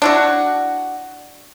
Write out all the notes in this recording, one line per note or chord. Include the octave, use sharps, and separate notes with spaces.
D4 E4 F#4